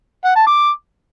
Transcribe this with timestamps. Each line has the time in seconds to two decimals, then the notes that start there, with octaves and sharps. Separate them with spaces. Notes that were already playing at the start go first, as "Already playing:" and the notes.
0.25 F#5
0.36 A5
0.47 D6